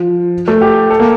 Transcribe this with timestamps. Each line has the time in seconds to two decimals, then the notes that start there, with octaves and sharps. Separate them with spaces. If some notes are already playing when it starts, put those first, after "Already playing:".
Already playing: F3
0.48 A3
0.61 G4
0.90 A4
0.99 A#3